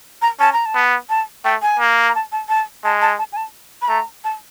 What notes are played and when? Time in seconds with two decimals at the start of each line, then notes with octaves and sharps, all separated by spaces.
0.22 A#5
0.40 C#4 A5
0.53 A#5
0.66 A5
0.75 B3
1.10 A5
1.44 A3 G5
1.62 G#5
1.79 A#3
2.08 A#5
2.15 A5
2.32 A5
2.49 A5
2.84 G#3 A5
3.01 A5
3.19 A5
3.32 G#5
3.37 A5
3.82 B5
3.88 A3 A#5
4.24 A5